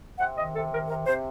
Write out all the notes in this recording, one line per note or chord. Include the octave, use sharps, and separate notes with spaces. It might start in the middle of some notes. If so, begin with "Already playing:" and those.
C3 F#5
D#3 D#5
C3 A4
D#3 A#4
C3 A#4
C3 C5